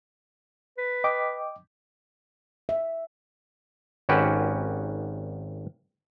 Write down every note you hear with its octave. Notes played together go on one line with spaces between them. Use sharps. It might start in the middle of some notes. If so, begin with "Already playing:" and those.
B4
D#5 G5 D6
E5
G#1 D#3 C#4 F#4 G4 B4